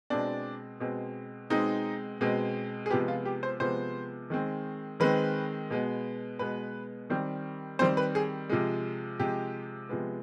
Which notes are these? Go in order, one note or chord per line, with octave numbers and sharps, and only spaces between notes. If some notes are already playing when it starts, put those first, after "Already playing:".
B2 G#3 C4 D4
B2 G#3 C4
B2 G#3 C4 D#4
B2 G#3 C4
G#4
C3 F3 G#3 B3 G4
F4
G4
C5
C3 F3 G#3 B3 C5
D#3 G#3 C4
D#3 G#3 C4 B4
B2 G#3 B3
B2 G#3 B3 B4
D#3 G3 C4
D#3 G3 C4 C5
B4
G#4
C3 F3 G#3
C3 F3 G#3 G4
C3 F3 G#3 B3